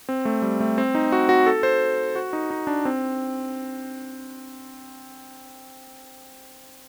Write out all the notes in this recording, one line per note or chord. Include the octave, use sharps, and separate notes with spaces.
C4
A3
G3
A3
C4
D#4
F#4
F#4
A4
C5
F#4
D#4
D#4
D4
C4